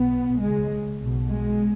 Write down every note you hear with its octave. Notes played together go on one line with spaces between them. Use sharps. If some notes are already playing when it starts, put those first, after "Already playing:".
Already playing: B1 B2 B3
C#2 C#3 G#3
B1 B2
G#3